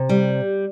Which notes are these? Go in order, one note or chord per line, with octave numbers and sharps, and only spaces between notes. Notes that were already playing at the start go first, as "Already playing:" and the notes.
Already playing: C3
G3